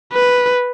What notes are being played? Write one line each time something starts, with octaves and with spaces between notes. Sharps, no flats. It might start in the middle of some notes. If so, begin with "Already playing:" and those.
B4